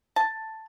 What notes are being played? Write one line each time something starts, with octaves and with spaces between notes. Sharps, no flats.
A5